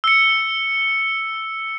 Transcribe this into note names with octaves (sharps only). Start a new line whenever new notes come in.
E6 C#7